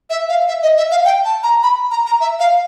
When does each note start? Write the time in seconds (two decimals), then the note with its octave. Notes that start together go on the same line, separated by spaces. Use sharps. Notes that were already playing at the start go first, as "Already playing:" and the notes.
0.10 E5
0.29 F5
0.48 E5
0.63 D#5
0.77 E5
0.91 F5
1.05 G5
1.25 A5
1.43 A#5
1.63 B5
1.91 A#5
2.06 A#5
2.21 E5
2.40 F5